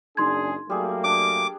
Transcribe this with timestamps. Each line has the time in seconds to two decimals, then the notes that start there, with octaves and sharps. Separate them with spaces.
0.17 F#1 D4 D#4 G#4 C6 G#6
0.70 F#3 G3 A3 A#3 G#4
1.04 D4 D6